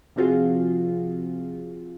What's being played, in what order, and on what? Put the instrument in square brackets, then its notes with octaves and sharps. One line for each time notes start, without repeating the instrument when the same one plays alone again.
[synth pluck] C3 F3 C4 F4 F#4 G#4